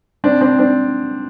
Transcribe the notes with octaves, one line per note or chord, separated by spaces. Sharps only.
C4 D4
C4 D4
C4 D4